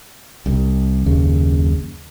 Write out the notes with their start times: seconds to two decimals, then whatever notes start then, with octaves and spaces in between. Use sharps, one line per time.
0.46 C2
1.06 F#1 D#2 C#3